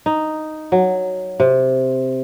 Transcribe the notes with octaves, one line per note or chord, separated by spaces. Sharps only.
D#4
F#3
C3